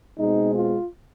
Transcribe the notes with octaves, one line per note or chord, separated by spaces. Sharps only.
B2 G#3 C4 D#4
F4